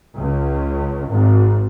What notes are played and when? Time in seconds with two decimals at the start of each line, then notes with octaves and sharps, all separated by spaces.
0.18 C#2
1.09 G#1